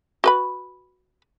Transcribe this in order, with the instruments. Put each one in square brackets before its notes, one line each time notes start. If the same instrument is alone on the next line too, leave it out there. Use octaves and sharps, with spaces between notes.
[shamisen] F#4 B4 B5